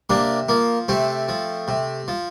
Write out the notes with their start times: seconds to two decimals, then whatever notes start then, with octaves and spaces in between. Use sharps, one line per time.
0.10 C3 A#3 D4
0.49 F3 A#3
0.89 C3 A3 C4
1.29 F3
1.68 C3
2.08 F3